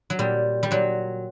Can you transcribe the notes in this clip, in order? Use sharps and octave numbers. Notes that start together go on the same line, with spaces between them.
F#3
A#2 G3
G3
A#2 F#3